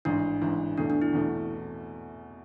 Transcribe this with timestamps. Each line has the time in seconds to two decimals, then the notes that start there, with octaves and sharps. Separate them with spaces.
0.05 A1 G#2 E3 D4
0.42 A1 G#2 E3
0.77 E2 B2 A3 D4
0.90 D4
1.02 E4
1.13 E2 B2 A3